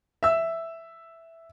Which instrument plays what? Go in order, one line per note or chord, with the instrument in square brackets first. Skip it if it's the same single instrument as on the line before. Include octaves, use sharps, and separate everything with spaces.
[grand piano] E5 E6